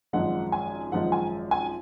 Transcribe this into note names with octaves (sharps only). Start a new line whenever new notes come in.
G#1 F#2 F3 G#3 F#5
G#5
G#1 F#2 F3 G#3 F#5
G#5
G#5